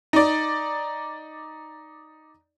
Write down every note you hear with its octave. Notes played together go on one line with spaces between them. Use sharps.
D#4 D5